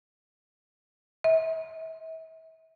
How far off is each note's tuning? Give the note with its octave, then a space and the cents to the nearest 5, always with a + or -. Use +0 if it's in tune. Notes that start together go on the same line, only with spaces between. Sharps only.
E5 -40